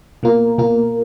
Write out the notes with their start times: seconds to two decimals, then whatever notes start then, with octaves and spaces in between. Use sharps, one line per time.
0.23 B2 A#3 F4 A#4
0.58 B2 A#3 F4 A#4